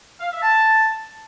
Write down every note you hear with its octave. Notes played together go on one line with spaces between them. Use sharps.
F5
E5
A5